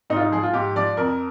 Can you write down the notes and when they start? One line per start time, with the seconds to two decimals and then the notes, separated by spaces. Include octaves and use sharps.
0.10 G#2 D#4
0.16 F4
0.20 D#4
0.31 F3 G#4
0.43 F4
0.53 G#2 G4
0.76 F3 D5
0.97 F2 A#4